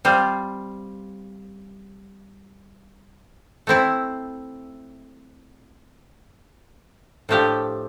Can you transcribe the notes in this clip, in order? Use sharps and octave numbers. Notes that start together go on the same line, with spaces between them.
G3 C4 F4
A3 C4 E4
A2 F3 A3 D4 G4